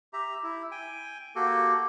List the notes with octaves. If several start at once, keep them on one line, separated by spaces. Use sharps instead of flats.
G4 E5 A#5
E4
G5 G#5
A#3 F#4 G4 A4